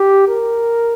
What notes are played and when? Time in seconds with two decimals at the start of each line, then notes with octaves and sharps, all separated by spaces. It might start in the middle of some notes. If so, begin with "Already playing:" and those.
Already playing: G4
0.28 A#4